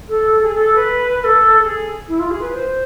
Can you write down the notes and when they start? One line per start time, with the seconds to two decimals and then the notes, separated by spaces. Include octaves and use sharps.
0.08 A4
0.30 A4
0.42 G#4
0.54 A4
0.74 B4
1.19 B4
1.23 A4
1.63 G#4
2.08 E4
2.19 F4
2.30 G#4
2.40 B4
2.52 C5